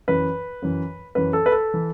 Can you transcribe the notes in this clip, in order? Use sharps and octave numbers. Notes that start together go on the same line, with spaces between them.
F#2 E3 B4
F#2 E3
F#2 E3 B4
A4
B4
A4
E3